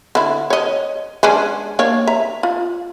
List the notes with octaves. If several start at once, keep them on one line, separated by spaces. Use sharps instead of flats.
D3 E4
C#5 D#5
G#3 C#4 D4
A#3 D4 C#5
E5 A#5
F4